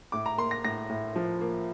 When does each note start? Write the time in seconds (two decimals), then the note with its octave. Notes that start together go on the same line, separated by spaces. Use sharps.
0.12 A2 D6
0.26 A#5
0.38 A#3 C6
0.51 A#6
0.64 A2 A#6
0.90 A2
1.16 F3
1.41 A#3